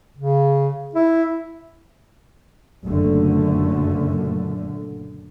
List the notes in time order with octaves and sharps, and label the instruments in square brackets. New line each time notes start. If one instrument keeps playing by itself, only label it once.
[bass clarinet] C#3
E4
[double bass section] F#1 F#2 A#2 D3 A3